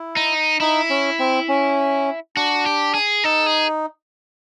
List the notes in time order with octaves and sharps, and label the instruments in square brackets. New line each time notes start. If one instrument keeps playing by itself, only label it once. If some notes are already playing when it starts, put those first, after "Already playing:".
Already playing: [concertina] E4
[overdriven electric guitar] D#4
[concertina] D#4 [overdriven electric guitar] E4
[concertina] C#4
C4
C#4
[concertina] D4 [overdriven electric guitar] F#4
[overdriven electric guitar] G4
G#4
[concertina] D#4 [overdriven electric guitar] A4
[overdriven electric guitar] G#4